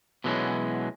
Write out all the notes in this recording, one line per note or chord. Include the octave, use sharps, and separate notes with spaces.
B2 E3 F#3 G#3 C#4